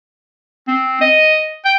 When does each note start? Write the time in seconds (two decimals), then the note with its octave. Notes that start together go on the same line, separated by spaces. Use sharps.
0.68 C4
1.01 D#5
1.65 G5